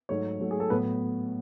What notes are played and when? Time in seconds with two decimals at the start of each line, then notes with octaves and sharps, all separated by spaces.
0.09 G#2 F#3 A3 C#5
0.40 G#2 F#3 A3
0.51 G#4
0.60 A4
0.70 A2 F#3 B3 B4